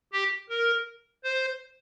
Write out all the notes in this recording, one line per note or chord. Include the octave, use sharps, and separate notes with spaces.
G4
A#4
C5